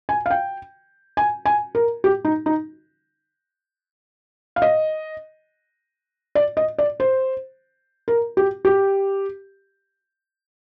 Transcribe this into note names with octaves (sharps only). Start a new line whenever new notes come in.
G#5
F5
G5
G#5
G#5
A#4
G4
D#4
D#4
F5
D#5
D5
D#5
D5
C5
A#4
G4
G4